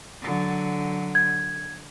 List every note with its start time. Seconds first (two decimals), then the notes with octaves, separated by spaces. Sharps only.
0.22 D3 F#3
1.15 G#6